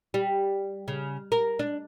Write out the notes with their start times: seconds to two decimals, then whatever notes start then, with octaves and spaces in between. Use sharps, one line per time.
0.14 G3
0.88 C#3
1.32 A#4
1.59 D4